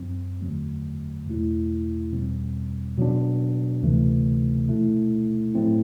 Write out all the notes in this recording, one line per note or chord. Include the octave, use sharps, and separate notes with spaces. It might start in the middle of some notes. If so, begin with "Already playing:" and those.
Already playing: F#2 F#3 C4
E2 D3 F#3 A3
E2 B2 A3 E4
E2 B2 G3 C4
B2 F#3 B3 D4
D2 C3 E3 A3
B2 A3 E4
A2 F#3 A3 C4 E4